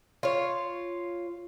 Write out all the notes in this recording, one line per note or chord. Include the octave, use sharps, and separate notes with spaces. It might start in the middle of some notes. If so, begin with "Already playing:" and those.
F4 C#5